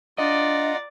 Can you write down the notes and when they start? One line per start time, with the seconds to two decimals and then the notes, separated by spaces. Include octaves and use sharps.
0.18 D4 F4 D5 D#5 F#5 A#5